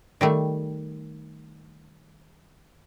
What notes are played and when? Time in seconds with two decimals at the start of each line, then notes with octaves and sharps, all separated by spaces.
0.21 D#3 G3 A3